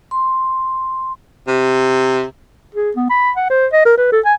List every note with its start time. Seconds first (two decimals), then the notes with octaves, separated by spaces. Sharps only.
0.11 C6
1.48 C3
2.74 G#4
2.96 B3
3.10 B5
3.36 F#5
3.50 C5
3.72 D#5
3.85 A#4
3.97 B4
4.12 A4
4.25 G#5